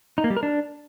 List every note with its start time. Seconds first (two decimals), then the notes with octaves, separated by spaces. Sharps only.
0.18 D#4
0.24 A#3
0.30 G3
0.37 A#4
0.43 D4